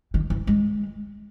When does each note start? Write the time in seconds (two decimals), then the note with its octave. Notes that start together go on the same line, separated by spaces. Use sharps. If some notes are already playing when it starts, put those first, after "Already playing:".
0.14 D#3
0.30 E3
0.47 G#3